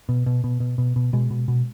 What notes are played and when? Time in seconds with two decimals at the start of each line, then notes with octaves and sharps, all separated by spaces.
0.09 B2
0.26 B2
0.44 B2
0.60 B2
0.78 B2
0.96 B2
1.13 B2 G#3
1.31 B2
1.48 B2